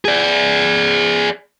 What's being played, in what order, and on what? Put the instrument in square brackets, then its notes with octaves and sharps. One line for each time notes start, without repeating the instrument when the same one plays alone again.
[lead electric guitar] G#4 D5